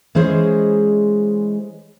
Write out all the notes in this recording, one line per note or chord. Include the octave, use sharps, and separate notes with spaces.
E3 G#3 C#4 G#4 C5 D#5